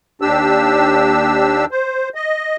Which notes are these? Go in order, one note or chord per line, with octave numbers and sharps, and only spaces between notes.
D#2 D4 G4 E6
C5
D#5